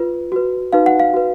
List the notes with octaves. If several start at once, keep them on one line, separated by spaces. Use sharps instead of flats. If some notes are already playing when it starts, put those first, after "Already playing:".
Already playing: F4 B4
F#4 B4
D#4 F#4 B4 F5
F#5
F5
F#4 B4